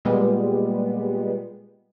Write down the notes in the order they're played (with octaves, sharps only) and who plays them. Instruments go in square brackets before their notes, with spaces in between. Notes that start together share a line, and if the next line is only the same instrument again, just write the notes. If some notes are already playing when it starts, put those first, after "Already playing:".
[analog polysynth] A#2 G3 G#3 B3